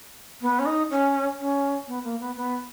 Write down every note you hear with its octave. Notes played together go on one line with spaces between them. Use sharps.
B3
C#4
D#4
C#4
C#4
B3
A#3
B3
B3